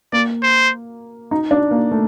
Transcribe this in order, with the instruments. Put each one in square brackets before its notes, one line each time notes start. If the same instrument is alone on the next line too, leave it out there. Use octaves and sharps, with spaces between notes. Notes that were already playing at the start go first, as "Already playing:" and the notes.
[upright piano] A#3 [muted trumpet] D5
[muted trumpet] C5
[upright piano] D#4
D4
A#3
A3